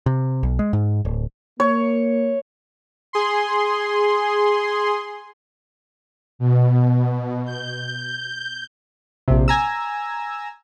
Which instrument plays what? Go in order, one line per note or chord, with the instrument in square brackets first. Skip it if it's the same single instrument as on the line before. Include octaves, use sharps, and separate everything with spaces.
[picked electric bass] C3
B1
G#3
G#2
D1
[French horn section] A#3 [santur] C#5
[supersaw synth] G#4 C6
[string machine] B2
G6
[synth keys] A#1 C3
G#5 A#5 E6